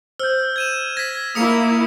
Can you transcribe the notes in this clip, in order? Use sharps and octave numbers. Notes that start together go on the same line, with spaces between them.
C5 E6 F6 G6
G#6 D#7 E7
G#6 A#6 B6
A#3 E4 D#6 C#7 F7